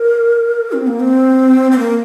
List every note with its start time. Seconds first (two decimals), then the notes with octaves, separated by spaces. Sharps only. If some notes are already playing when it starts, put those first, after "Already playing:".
Already playing: A#4
0.72 C4
0.87 A#3
1.00 C4
1.71 C4
1.79 A#3